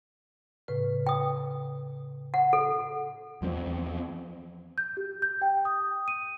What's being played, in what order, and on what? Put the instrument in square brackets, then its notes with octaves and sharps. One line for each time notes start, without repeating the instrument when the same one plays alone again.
[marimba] A2 C#3 B4
[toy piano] G5 D#6
F#5
A4
[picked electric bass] E2 F3 A#3 C4
[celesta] G6
G4
G6
G5
D#6
D#7